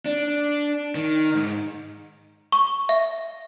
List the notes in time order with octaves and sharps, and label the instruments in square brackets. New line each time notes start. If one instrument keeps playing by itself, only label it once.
[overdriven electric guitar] D4
D#3
G#2
[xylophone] C#6
E5